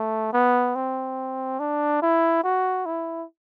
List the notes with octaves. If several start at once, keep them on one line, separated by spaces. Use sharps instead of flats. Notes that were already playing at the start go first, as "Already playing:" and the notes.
Already playing: A3
B3
C4
D4
E4
F#4
E4